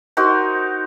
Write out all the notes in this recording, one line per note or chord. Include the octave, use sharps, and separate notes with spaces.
D#4 F#4 A#4 C5